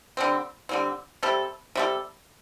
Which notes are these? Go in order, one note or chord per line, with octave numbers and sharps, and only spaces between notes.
D3 G3 C4
D3 G3 C4
C3 G3 C4 A4
C3 G3 C4 A4